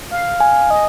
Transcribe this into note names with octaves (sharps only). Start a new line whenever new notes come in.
F5
G#5
D#5